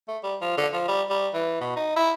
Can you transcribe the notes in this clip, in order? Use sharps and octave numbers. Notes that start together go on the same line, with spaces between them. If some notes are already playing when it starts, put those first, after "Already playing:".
A3
G3
F3
D3
F3
G3
G3
E3
B2
D#4
E4